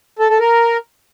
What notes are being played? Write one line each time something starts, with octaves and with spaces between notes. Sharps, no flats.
A4
A4
A#4